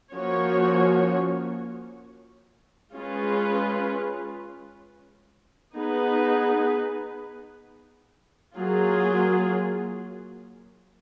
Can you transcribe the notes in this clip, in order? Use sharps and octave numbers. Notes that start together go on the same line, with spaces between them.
F3 A#3 C#4 F#4 C#5
G#3 C#4 F4 B4
B3 D#4 G#4 B4
F#3 A#3 F4 G#4